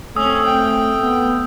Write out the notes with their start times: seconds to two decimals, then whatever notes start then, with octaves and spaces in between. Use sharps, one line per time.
0.16 A3 C4 C#4 D#6 E6
0.45 G5
0.97 B3